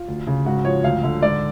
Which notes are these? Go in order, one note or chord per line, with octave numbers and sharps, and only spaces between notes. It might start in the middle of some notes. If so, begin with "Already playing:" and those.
Already playing: F4
D2
C#3
G#2 F#4
F3 C#5
D2 F5
D3
G#2 D5